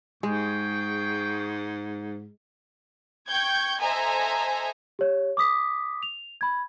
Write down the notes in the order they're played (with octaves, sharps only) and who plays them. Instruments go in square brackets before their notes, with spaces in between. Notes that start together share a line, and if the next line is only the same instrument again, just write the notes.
[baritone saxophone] G#2 [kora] G#3 [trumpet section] G#4 G5 C#6
[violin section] G5 C#6 G6 G#6
A4 C5 D#5 E5 G#5 A#5
[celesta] G4 C#5
D6 D#6 B6
F7
B5 G#6